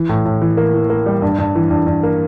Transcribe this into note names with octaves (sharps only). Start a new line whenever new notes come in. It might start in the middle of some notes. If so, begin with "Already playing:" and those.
Already playing: E3
A2
A2
E3
A#3
E3
A#3
G3
G2
G2
E3
G2
G2
A#3